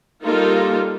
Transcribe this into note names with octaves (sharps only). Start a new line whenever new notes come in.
G3 A#3 D#4 F4 A4 A#4